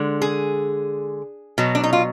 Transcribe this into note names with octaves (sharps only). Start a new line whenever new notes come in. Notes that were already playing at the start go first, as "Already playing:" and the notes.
Already playing: D3 G#3
G#4
B2 F#3
D4
D#4
F4